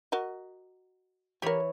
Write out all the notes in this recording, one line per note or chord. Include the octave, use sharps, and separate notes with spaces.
F#4 A#4 D#5
E3 G4 A#4 C#5 B5